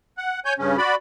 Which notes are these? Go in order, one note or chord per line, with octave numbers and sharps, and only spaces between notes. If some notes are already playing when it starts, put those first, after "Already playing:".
F#5
C#5 G#5 G6
G2 C#3 C#4
F#4 D5 B5